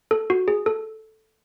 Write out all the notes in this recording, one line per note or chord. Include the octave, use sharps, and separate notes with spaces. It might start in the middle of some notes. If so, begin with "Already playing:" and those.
A4
F#4
G#4
A4